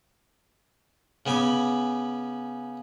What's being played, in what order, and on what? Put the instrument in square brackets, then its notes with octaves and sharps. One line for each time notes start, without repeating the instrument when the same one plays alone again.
[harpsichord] C#3 B3 G#5 B5 D6